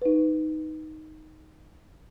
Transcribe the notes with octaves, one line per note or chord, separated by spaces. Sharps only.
D#4 B4